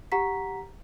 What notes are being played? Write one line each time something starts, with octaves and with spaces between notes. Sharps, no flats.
G4 F#5 A#5 B6